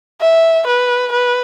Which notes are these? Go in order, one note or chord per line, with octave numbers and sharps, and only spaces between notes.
E5
B4
B4